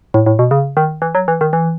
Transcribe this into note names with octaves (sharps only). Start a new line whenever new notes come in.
A2
A2
B2
C#3
D#3
E3
F#3
E3
D#3
E3